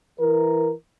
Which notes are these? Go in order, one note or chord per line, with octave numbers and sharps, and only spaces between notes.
E3 A#4